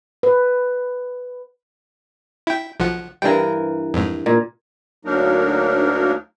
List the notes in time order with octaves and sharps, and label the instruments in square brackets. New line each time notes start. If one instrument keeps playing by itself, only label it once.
[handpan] B4
[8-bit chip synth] E4 G5
B1 F3 F#5
[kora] G2 E3 A#4 [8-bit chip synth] D4 G5
[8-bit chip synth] F2 G#2
[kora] A#2
[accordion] D2 F#3 A#3 D4 D#4 A#4